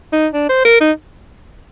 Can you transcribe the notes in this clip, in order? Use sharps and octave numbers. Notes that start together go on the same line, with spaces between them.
D#4
D4
C5
A#4
D#4